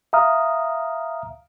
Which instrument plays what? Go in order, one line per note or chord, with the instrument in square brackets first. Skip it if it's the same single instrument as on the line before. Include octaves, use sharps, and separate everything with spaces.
[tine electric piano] E5 F5 A#5 D#6 F6